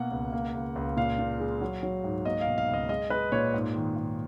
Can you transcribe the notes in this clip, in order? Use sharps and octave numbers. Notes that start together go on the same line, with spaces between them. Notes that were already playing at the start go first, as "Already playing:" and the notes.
Already playing: B2 A#3 F#5
C#2
A#3
C#2
C#2
A#2 F5
A#2
G#3
F#3
F#3
G#2
A#3 D#5
F5
B2
F5
C#2
D#5
G#3 D#5
G#3 B4
A#2 C#5
G#2
D#3
G#2